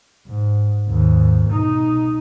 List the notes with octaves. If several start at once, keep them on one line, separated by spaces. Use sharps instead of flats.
G#2
D#2 G#2
B2 D#4